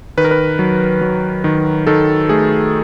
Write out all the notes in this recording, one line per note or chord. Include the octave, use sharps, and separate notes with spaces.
D#3 B4
A#4
B4
F#3
F#3
D#3
D#3 A4
A3 G#4